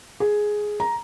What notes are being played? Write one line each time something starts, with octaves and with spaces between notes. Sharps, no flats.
G#4
A#5